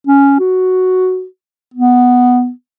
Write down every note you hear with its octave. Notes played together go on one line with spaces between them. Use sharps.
C#4
F#4
B3